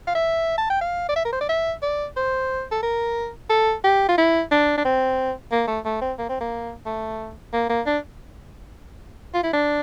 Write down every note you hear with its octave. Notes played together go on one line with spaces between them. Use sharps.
F5
E5
A5
G5
F5
D5
E5
A#4
C5
D5
E5
D5
C5
A4
A#4
A4
G4
F4
E4
D4
D4
C4
A#3
A3
A3
C4
A#3
C4
A#3
A3
A#3
A#3
D4
F4
E4
D4